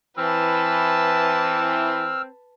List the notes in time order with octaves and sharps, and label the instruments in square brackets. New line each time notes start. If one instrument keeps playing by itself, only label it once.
[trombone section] E3 [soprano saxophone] C4 [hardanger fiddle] B4 A5 [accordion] E6 F6